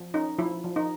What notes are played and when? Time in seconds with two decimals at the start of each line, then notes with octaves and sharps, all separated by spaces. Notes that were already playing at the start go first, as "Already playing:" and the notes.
Already playing: F3
0.14 C#4 D#4
0.39 F3 E4
0.64 F3
0.76 D#4